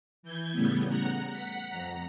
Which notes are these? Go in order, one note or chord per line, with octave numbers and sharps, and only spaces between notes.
E3 G6 G#6
A2 C#3 G3 A3 B3
F#5 A#5
F#5 B6
F2 A#5